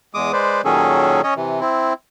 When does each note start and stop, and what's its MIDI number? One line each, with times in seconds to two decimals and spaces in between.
0.14 0.32 40
0.14 0.32 56
0.14 0.32 86
0.14 0.32 87
0.33 0.62 56
0.33 0.62 71
0.33 0.62 72
0.33 0.62 74
0.65 1.21 46
0.65 1.21 51
0.65 1.21 54
0.65 1.21 61
0.65 1.21 68
0.65 1.21 69
1.23 1.34 61
1.23 1.34 73
1.23 1.34 75
1.36 1.60 48
1.36 1.60 52
1.60 1.93 60
1.60 1.93 64